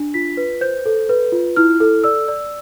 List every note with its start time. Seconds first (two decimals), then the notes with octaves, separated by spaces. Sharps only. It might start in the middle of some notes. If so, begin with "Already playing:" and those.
Already playing: D4
0.14 F4 B6
0.37 B4
0.61 C5 G6
0.86 A4
1.09 B4
1.32 F4
1.56 E4 F6
1.80 A4
2.04 D5 E6
2.28 D5